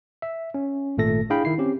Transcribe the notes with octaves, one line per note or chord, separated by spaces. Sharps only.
E5
C#4
G#1 A#2 A3 A4 A#6
D4 E4 G#4 F5 G5 B5
D#3 E4 C7
C4 C#4 G4